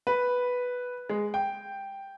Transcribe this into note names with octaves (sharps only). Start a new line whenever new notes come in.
B4
G#3
G5